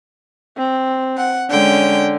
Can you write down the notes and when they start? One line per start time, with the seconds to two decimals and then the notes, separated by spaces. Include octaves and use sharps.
0.57 C4
1.17 F#5
1.50 D3 G#3 C#4 G5